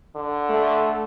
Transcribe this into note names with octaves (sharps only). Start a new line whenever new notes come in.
D3
A3